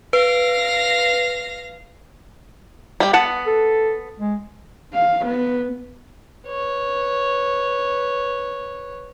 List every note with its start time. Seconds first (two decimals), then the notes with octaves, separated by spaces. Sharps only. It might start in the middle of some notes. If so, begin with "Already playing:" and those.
0.13 B4 F5 A#6
3.00 G3 G5
3.13 B3 F#5 A5
3.47 A4
4.19 G#3
4.94 F5
5.26 B3
6.47 B4 C#5